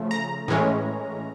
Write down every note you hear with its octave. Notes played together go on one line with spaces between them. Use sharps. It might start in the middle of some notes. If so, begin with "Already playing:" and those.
Already playing: C#3 F3 A3
A#5
A2 E3 G#3 C#4